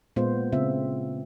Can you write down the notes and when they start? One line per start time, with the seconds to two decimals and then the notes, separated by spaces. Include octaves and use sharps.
0.16 A#2 G#3 B3 F4 C5
0.52 C#3 C4 F4 E5